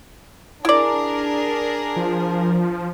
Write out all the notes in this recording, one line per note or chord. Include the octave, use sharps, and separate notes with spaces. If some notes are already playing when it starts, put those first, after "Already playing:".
D4 E4 G#4 A#4 D5
F3